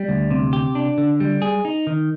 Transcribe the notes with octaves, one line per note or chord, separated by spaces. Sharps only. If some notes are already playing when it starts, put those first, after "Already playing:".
Already playing: G3
D2
C3
G4
D4
D3
G3
G#4
D#4
D#3